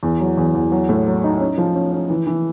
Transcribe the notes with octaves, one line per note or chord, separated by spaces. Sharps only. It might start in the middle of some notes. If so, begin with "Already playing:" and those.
E2
F#3
E2
E2
F#3
A2
F#3
D#4
C#4
F3
C#4
C#4
E3
E3